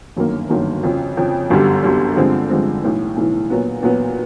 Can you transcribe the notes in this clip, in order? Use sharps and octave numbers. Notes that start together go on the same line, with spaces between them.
G1 F#2 D#3 F#3 A#3
G1 F#2 D#3 F#3 A#3
F2 C#3 F3
F2 C#3 F3
G1 F#2 D3 G3
G1 F#2 D3 G3
G2 D3 F3 G#3 C4
G2 D3 F3 G#3 C4
B1 A2 E3
B1 A2 E3
A#2 F#3 B3
A#2 F#3 B3